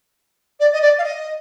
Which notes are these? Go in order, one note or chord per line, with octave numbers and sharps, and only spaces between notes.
D5
D#5
D5
F5
D#5